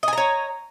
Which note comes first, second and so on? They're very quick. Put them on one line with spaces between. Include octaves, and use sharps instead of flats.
D#5 G#5 A#5 C#5